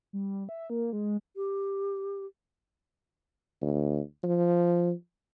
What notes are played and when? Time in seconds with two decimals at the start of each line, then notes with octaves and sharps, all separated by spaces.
0.13 G3
0.49 E5
0.70 A#3
0.93 G#3
1.36 G4
3.62 D2
4.23 F3